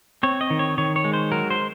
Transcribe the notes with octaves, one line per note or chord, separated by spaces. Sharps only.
C4 C#5
D#5
D#3
C#5
D#3 C#5
C#5
G#3
C5
F#3 A#4
C5